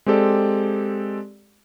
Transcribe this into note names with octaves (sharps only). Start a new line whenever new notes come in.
G#3 C4 G4 A4 D5